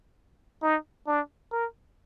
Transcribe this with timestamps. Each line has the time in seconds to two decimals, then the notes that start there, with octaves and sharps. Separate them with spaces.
0.63 D#4
1.07 D4
1.52 A#4